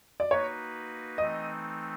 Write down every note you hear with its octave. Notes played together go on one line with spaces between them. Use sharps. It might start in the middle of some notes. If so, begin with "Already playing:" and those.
D5
A#3 D#4 F#4 B4 C#5
E3 A3 C4 D#4 D#5